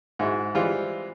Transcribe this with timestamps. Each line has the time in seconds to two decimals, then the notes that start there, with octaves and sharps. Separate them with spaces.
0.19 G#2 E4 F#4
0.55 E3 G3 G#3 C4 E4 F4